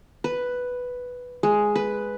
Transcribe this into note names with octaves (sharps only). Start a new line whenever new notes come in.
B4
G#3
B4